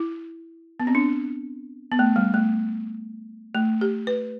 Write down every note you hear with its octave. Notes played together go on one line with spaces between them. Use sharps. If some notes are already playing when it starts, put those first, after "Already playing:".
Already playing: E4
B3
C4
D4
B3
A3
G3
A3
A3
G4
B4